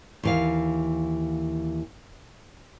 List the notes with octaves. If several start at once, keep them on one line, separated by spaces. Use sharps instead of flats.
D#2 E3 F5